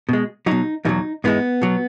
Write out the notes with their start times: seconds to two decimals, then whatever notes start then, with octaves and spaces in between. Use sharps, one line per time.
0.09 B2 G#3
0.46 B2 F#3 D#4
0.85 E2 B2 F#3 D#4
1.24 G#2 E3 G#3 B3
1.62 B2 F#3